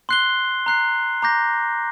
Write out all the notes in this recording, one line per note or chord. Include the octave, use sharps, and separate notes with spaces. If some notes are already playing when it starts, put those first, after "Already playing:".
C6 F#6 C7 G7
A#5 F#6 C7
A#5 D6 G6 A#6